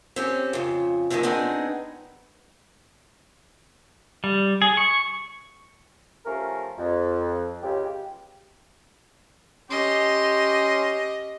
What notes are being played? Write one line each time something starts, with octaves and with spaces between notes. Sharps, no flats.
C4 C#4 G4
F2 C#3
F#2 A#2 D3 D#3 G#3
B3 C4 D4 D#4 G#4
G3
G#4
C#6
F3 A3 C#4 G4 A#4
F2
C#2 C#3 G4
C#4 G4 D#5 C6